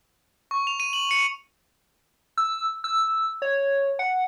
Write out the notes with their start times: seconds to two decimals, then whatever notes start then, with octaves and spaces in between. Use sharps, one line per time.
0.51 C#6
0.67 F7
0.80 D#7
0.93 F#7
1.11 C#7
2.38 E6
2.84 E6
3.42 C#5
3.99 F#5